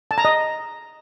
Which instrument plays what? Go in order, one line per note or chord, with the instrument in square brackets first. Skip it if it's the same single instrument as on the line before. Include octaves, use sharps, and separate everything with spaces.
[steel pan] A5
A#5
D#5